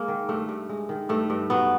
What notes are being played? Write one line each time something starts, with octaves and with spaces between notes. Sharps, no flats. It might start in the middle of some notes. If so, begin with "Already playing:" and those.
Already playing: G#3 A#3
D#3
G2 A3
G2
G#3
D#3
G2 A3
G2
F#3 B3